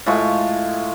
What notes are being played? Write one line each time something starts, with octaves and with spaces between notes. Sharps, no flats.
A2 G#3 F4 C#6